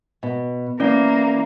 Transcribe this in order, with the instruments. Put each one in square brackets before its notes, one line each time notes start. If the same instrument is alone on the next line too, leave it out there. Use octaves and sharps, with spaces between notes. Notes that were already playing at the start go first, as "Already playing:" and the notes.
[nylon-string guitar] B2
[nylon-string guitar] E3 [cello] A#3 [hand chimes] C#4 D5